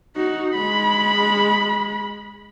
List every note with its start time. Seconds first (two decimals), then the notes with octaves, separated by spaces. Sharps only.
0.16 D#4 F#4
0.54 G#3 B5